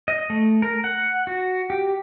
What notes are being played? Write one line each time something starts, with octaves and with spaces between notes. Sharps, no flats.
D#5
A3
A#4
F#5
F#4
G4